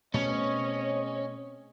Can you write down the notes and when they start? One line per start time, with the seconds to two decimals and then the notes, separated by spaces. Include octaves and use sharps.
0.14 B2 A3 C4 C#4 G#4 C#5 D#5